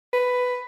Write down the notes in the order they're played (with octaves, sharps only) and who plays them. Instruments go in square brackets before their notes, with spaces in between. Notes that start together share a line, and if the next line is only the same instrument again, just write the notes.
[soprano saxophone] B4